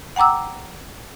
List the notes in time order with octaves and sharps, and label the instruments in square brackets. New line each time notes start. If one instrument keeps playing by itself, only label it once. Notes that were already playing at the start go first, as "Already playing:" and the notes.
[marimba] F#5 G5 A#5 D6 E6